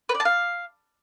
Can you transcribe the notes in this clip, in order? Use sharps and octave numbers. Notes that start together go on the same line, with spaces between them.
B4
D5
A5
F5